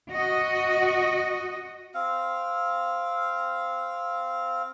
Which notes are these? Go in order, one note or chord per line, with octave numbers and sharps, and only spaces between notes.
F#4 D#5
C4 F5